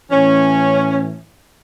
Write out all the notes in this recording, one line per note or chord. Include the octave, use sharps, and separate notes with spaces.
A2 E3 C#4